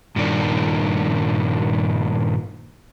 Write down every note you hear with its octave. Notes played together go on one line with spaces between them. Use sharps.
G2 A#2 D#3 D4